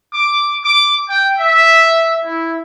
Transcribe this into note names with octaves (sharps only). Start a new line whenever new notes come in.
D6
D6
G5
E5
E4